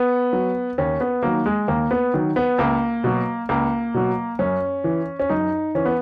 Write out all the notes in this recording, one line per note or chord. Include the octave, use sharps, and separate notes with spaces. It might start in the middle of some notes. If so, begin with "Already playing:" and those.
Already playing: B3
F#3
D#2 C#4
B3
D#3 F#3 A#3
G#3
D#2 A#3
B3
D#3 F#3
B3
C#2 A#3
B2 F#3
C#2 A#3
B2 F#3
F#2 C#4
E3
C#4
F#2 D#4
E3 C#4
B3